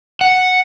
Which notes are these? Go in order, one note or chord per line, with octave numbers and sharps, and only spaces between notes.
F#5